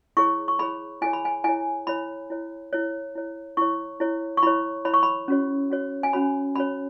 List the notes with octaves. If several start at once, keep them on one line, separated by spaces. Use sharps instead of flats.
E4 G#4 C#5 C#6
C#6
E4 G#4 C#5 B5
E4 G#4 C#5 G#5
B5
G#5
E4 G#4 C#5 G#5
E4 C#5 B5
E4 C#5
E4 C#5
E4 C#5
E4 C#5 C#6
E4 C#5
C#6
E4 C#5 B5
E4 C#5 B5
C#6
B5
C#4 F#4 C#5
C#4 F#4 C#5
G#5
C#4 F#4 C#5 B5
C#4 F#4 C#5 B5